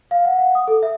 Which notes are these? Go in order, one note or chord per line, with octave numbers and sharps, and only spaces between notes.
F5
F#5
F#5
D#6
A4
E5